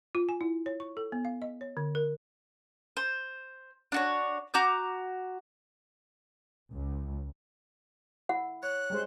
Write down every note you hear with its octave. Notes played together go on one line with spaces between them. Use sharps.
F4
G#5
E4
C#5
C#6
A4
B3
F5
D#5
C#5
D3
A#4
C5
D4 F#4 C#5
F#4 A#5 D6 G6
C#2
E4 F#5
C#5 F#6
G3 G#3 C5